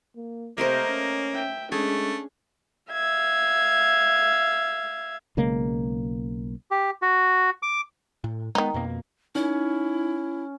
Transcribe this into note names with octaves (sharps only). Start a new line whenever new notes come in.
A#3
C3 A3 A#3 A#4 C5 D#5
C#4
E5 G5
G#3 A3 C#4 D4 G#4
E5 F5 G#6
B1 C#3 G#3 A#3
G4
F#4
D6
A2
D#3 G#3 A#3 B3 D#4
F2 B2 A#3
C#4 D#4 E4